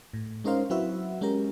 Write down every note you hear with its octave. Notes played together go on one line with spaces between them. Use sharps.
A2
G#3 C#4 D#4 A#4 C5 F5
F#3 C4 E4 F#4 B4 E5
G#3 C#4 G4 A#4